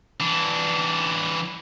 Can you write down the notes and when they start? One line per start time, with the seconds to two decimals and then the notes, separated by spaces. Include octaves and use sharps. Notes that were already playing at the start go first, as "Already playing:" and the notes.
0.20 E3 D4